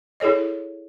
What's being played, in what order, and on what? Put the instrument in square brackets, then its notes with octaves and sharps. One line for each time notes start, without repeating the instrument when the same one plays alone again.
[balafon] E4 G#4 A4 C#5 D#5